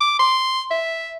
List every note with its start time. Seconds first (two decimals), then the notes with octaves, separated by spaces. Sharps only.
0.01 D6
0.19 C6
0.71 E5